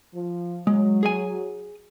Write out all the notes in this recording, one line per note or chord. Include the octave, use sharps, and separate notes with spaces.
F3
F#3 G#3
G#4 G#5